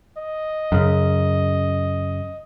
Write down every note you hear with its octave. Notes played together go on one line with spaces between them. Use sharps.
D#5
F#2 C#3